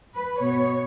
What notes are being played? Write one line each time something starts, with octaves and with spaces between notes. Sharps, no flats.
B4
B2 B3 C#5